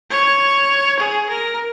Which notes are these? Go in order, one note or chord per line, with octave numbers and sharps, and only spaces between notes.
C#5
G#4
A#4